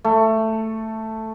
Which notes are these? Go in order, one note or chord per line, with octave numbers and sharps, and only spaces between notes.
A3